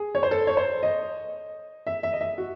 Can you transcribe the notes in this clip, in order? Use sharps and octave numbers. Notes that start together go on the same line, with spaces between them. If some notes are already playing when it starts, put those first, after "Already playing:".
Already playing: G#4
C#5
C5
A4
C#5
C5
D#5
E5
E5
D#5
E5
F#4